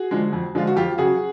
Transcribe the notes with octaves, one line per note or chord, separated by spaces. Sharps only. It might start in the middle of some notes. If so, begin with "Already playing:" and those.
Already playing: F#4 G#4
D3 F3 G#3
F2
D3 F3 G#3 F4
F#4
F2 F4 G4
C#3 F#3 F#4 G#4